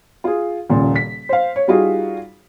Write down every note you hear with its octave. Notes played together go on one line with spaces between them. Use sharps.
F4 G#4
D#1 A#2 C#3
B6
C5 F5
C#5
G3 D#4 F4 F#4 G#4